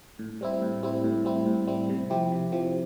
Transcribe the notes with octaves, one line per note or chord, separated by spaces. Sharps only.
A2
G3 C4 E4
A2
G3 C4 E4
A2
G3 C4 E4
A2
G3 C4 E4
C3
F3 C4 E4 G4
C3
F3 C4 E4 G4